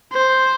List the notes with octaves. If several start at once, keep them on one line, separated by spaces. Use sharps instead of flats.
C5